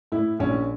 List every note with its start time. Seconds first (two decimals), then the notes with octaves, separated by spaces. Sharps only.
0.12 A2 E4
0.39 A#1 C#4